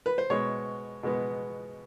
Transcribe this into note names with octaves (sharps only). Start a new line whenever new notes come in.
B4
C5
B2 G#3 B3 C#5
B2 G#3 B3